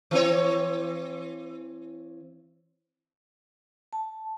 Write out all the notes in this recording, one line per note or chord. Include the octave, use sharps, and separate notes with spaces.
E3 C4 C#5
A5